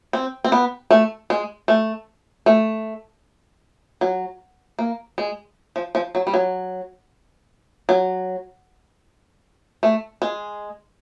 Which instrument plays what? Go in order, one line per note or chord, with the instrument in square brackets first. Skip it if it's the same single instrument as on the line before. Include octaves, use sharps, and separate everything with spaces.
[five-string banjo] C4
C4
B3
A3
G#3
A3
A3
F#3
A#3
G#3
F3
F3
F#3
G3
F#3
F#3
A3
G#3